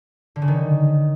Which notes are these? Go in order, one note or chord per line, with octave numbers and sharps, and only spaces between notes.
D3
C#3
D#3